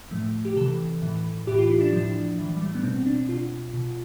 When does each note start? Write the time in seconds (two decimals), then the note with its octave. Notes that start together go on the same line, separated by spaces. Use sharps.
0.11 A2 F3 A3
0.45 G4
0.56 C3 E3 A4
1.02 A2 E3
1.47 A2 E3 G4
1.58 F4
1.70 E4
1.81 D4
1.93 A2 F3 D4
2.38 A2 E3
2.56 G3
2.65 A3
2.75 B3
2.83 B2 C4
3.06 D4
3.29 B2 F4
3.74 B2